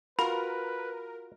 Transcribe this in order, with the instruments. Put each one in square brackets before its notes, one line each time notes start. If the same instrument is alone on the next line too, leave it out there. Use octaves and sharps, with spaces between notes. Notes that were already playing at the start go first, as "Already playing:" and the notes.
[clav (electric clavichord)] F4 F#4 [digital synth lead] A#4 [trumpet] B4 [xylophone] B5